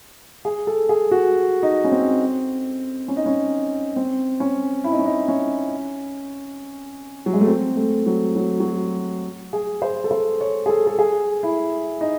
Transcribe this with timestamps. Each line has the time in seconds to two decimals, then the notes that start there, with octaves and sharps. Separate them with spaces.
0.45 G#4
0.67 A4
0.89 G#4
1.11 F#4
1.63 D#4
1.85 C#4
1.92 C4
3.08 C#4
3.17 D#4
3.26 C#4
3.96 C4
4.40 C#4
4.84 E4
4.92 D#4
4.99 C#4
5.06 D#4
5.28 C#4
7.26 F#3
7.33 G#3
7.41 A3
7.47 C4
7.76 A3
8.06 F#3
8.36 F#3
8.60 F#3
9.53 G#4
9.82 C5
10.04 A4
10.11 C5
10.41 C#5
10.66 G#4
10.69 A4
10.87 A4
10.99 G#4
11.43 E4
12.01 D#4